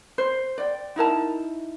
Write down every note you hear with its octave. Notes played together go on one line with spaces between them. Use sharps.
C5
D5 G5
D#4 E4 A#4 A5